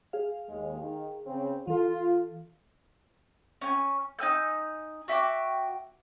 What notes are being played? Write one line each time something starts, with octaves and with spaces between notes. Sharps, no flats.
G#4 F5
D#2 G#3
D#3
C#3 C4
E3 F4 A4
C#4 G#5
D#4 G#5 E6 G6
F#4 E5 G5 D6